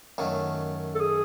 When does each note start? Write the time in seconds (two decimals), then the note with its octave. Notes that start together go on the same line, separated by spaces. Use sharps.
0.18 F#2 D#3 F#3 A3
0.95 A4
1.00 G#4